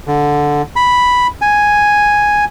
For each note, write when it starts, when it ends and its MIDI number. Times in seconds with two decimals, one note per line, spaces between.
0.08 0.62 50
0.76 1.27 83
1.42 2.45 80